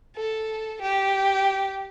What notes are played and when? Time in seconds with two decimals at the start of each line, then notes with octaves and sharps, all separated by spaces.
0.16 A4
0.82 G4